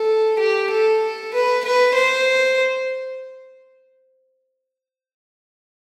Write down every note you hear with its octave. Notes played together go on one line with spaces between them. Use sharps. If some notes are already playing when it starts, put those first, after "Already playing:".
Already playing: A4
G4
A4
B4
B4
C5